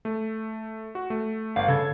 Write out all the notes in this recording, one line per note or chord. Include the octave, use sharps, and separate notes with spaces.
A3
F#4
A3
G1 F5
C#3 A4 G#6